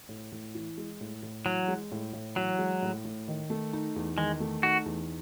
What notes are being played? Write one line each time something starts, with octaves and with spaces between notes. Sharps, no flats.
A2
A2
E3
G#3
A2
A2
E3 F#3
G#3
A2
A2
E3 F#3
G#3
A2
A2
D#3
A3
D#4
E2
D#3 G#3
A3
D#4 F#4
E2